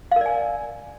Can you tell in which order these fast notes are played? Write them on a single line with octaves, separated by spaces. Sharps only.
F5 A#4 D5 G#5